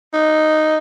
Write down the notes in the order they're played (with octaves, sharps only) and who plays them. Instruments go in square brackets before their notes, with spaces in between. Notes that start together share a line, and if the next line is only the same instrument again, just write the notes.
[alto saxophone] D#4